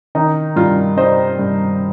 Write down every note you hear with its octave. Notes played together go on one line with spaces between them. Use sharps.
D#3 D#4
G2 F4
G3 C5 D#5
G2